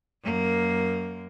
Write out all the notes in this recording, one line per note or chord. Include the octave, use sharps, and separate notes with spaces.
F#2 A#3